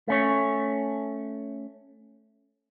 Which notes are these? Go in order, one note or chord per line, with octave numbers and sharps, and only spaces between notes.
A3 C#4 C#5